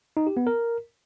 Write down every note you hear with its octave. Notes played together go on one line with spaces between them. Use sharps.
D#4
G4
B3
A#4